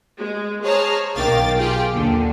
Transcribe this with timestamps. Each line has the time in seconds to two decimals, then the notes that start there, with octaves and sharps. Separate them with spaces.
0.18 G#3
0.63 G#4 C5 C#5 A5 A#5 F6
1.14 B1 D#3 F5 G5 D6 A6
1.57 F4 G4 G#4 G5
1.93 D#2 A#2 D3